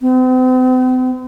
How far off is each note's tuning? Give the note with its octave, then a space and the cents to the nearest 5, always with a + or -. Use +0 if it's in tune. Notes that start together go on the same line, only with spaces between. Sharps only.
C4 -45